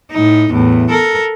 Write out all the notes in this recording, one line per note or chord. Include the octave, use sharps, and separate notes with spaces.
A2 D#4
E2 A2
A4 A#4